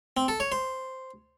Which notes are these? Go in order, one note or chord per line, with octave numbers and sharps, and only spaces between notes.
C4
A4
C#5
C5